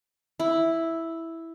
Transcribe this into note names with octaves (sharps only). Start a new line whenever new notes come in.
E4